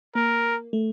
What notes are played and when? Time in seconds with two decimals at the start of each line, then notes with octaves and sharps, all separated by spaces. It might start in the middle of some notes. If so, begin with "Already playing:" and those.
0.15 A#3 A#4
0.73 A3